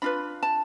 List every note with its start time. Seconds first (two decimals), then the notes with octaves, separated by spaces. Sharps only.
0.02 D4 F4 B4 B5
0.43 A5